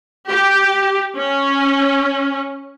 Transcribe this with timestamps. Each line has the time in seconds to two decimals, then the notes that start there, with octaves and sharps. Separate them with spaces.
0.29 G4
1.18 C#4